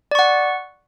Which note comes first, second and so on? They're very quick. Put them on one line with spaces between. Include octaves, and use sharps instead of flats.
D5 C#6 F#5